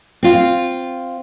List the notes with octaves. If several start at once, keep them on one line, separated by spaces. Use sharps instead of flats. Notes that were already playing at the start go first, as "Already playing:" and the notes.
C4 F4